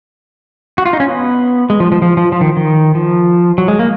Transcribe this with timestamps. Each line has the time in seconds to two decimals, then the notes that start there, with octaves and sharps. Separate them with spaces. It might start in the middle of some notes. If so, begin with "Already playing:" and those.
0.78 F#4
0.86 F4
0.93 D#4
1.00 C#4
1.08 B3
1.70 G#3
1.80 F3
1.92 F3
2.02 F3
2.17 F3
2.32 F3
2.41 D#3
2.57 D#3
2.95 F3
3.58 F#3
3.68 G#3
3.79 A#3